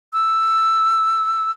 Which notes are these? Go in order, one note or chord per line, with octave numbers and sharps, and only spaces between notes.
E6